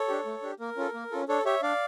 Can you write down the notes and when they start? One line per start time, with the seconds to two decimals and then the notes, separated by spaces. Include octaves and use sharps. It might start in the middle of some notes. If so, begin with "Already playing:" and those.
Already playing: A4 C#5
0.08 D4 G4
0.25 A3
0.43 D4 G4
0.60 A#3 A#4
0.77 C#4 F4 A4
0.94 A#3
1.11 C#4 F4 A4
1.28 D4 A4 C#5
1.45 G4 C#5 E5
1.62 D4 D5 F5